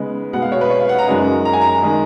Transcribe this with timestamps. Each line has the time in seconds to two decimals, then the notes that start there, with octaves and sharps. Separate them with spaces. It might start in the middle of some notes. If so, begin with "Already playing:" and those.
Already playing: C#3 G#3 B3 D#4
0.33 B2 G#3 B3 F#5
0.42 F5
0.52 C#5
0.61 B4
0.70 C#5
0.80 F5
0.89 F#5
0.98 A#5
1.07 F#2 C#3 G#3 D#4
1.45 A#5
1.53 G#5
1.61 A#5
1.83 D#3 G#3 D#4